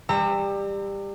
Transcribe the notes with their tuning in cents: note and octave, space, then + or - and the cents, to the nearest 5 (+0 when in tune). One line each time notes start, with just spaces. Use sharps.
G3 +20 A#5 -35 E6 +0